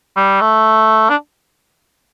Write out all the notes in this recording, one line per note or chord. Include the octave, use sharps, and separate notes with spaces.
G3
A3
D4